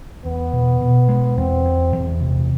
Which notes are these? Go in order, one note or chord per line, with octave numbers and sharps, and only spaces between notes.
E2 B3
B2
B2
G#3
E2 C4
E2
E2
C3